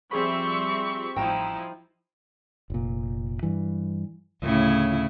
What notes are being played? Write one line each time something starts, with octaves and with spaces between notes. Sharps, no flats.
F3 G3 C4 G#4 E5 B5 C#6
A1 F3 D#4 E4 G5 A#5 E7
F1 A#2
G2 E3
D2 A2 C#3 E4